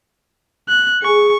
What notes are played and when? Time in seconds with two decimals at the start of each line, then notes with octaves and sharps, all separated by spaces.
0.69 F#6
1.03 G#4 C#6